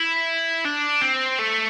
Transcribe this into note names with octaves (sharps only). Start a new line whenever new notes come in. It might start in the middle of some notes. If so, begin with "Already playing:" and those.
Already playing: E4
D4
C4
A3